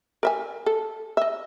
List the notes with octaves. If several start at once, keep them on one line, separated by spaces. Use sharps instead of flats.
A#4 E5 G#5
A4
D#5 E5